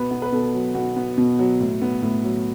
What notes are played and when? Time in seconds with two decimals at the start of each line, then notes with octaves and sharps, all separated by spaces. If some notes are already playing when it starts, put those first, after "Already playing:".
Already playing: B2 B3 B4
0.11 B3
0.22 B4
0.32 B2 A4
0.54 F#3
0.75 B2 F#4
0.96 B3
1.17 B2
1.39 F#3
1.60 A2
1.82 B3
2.02 A2
2.24 F#3